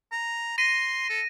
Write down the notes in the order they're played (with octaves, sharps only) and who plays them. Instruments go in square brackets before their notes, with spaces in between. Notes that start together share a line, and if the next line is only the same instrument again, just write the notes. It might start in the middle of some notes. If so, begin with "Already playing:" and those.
[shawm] A#5
[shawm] C6 [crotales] A#6 D#7
[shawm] A4